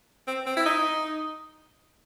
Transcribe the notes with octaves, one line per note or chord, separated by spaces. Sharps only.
C4
C4
E4
D#4